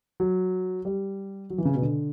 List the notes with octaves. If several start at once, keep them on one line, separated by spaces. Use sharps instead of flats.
F#3
G3
F#3
E3
C#3
B2
D3